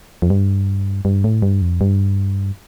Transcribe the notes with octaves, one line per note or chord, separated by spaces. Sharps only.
F2
G2
G2
A2
G2
F2
G2